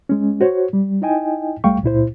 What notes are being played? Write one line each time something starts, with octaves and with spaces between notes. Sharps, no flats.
G#3 C#4
F#4 C5 C#5
G3
D#4 E4 D#5 G5 G#5
C2 G3 A3 F5 G5 C#6
C#2 A#2 E4 C5